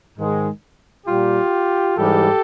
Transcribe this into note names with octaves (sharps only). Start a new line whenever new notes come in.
G#2 D#3 G#3
A#2 G3 F4 G4
G#2 E3 G3 G4 A4